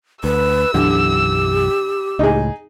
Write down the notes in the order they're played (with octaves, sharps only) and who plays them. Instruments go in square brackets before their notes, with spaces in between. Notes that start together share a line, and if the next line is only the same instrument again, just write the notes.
[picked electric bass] D2 [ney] B4 [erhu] E6
[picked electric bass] B1 F#2 E3 [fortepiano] D3 [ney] G4
[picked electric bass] C#2 A2 [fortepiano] D#4 G#4